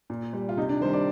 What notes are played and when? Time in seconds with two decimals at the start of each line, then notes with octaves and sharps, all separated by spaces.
0.10 A#2
0.33 G3
0.49 F4
0.57 C3 D#4
0.69 D4
0.81 D#3 C5
0.85 G3
0.93 D5